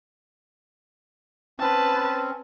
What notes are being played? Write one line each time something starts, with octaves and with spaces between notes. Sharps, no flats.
C4 C#4 B4 A5